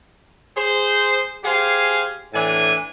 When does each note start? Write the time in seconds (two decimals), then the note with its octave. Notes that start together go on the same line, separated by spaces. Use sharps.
0.57 G#4 C5
1.44 G4 G#4 C5 F5 G#5
2.34 A2 E3 D4 G#5